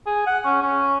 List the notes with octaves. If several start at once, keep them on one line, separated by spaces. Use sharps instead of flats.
G#4
F#5
C#4
C#4